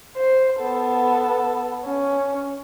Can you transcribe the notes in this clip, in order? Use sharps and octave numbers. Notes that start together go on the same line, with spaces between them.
C5
B3 A4
C#4